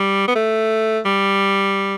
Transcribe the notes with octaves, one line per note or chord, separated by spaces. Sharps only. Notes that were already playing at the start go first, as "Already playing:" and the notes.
Already playing: G3
B3
A3
G3